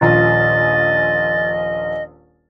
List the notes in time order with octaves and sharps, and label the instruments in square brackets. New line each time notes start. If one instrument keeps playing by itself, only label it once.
[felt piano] D#1 A#1 F4 [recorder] D#5 [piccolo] A6